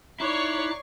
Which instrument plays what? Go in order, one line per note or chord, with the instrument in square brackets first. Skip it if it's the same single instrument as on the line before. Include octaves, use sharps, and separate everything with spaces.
[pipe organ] D#4 D6 F#6 [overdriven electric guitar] E4 [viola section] C#5 [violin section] D5 C#6 C7